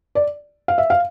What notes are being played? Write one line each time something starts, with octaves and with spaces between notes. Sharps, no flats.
D5
F5
E5
F5